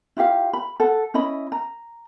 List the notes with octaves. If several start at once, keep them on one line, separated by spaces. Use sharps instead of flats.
E4 F4 G4 F5
B5
A4 F#5
C#4 E4 D#5 B5
A#5